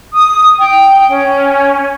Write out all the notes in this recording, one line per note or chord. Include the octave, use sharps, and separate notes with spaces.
D#6
G5
C#4